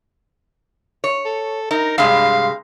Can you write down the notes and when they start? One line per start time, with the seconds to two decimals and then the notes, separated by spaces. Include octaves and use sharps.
1.04 C#5
1.25 A4
1.71 D#4 A#4
1.98 G2 C3 G#3 F5